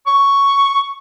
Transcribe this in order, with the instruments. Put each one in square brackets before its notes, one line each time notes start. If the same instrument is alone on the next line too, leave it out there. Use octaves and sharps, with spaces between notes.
[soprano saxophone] C#6